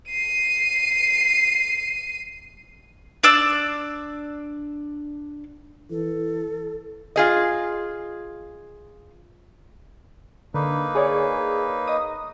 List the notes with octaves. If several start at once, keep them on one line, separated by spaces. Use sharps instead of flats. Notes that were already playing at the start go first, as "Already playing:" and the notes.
C7 D#7
D4 D5 E6
E3 A4
F4 G#4 D#5
D3 A#3 D#4 B4
G#4 C#5 D5
D#5 D#6